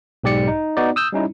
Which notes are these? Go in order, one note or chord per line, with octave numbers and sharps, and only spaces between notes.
B1 G#2 G4 D5 C#7
D#4
B3 D#4 F#4 D5
D#6 E6 G6
G3 C#4 D#4 E4